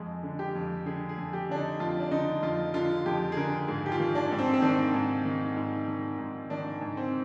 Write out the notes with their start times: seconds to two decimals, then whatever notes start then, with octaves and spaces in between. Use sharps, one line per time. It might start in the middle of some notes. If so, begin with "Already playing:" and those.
Already playing: F2 G#3
0.23 D3
0.39 G4
0.55 F2
0.86 D3 G#4
1.09 G#4
1.18 F2
1.33 G4
1.49 D3 D4
1.56 D#4
1.80 F2 F4
2.00 D4
2.11 D3 D#4
2.42 F2 F4
2.74 D3 F4
3.06 F2 G4
3.32 G#4
3.37 D3 A#4
3.68 G#2 G#4
3.86 G4
3.92 F4
4.00 D#3
4.15 D4
4.31 G#2
4.39 C4
4.53 C4
4.62 D#3 D4
4.94 G#2
5.25 D#3
5.57 G#2
5.88 D#3
6.19 G#2
6.50 D#3 D4
6.81 G#2
6.97 C4